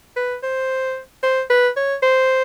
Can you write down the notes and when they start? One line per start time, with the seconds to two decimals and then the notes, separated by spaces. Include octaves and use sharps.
0.16 B4
0.43 C5
1.23 C5
1.49 B4
1.76 C#5
2.02 C5